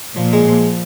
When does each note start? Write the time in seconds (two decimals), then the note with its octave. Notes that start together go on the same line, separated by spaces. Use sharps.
0.16 A#2 F3
0.33 G#3
0.48 F3